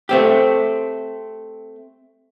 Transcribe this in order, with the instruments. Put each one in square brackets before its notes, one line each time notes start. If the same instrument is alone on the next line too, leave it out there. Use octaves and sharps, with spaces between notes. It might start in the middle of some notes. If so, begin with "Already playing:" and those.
[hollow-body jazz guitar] A3 C4 G4